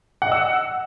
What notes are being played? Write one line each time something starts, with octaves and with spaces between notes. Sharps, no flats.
D#5 F#5 E6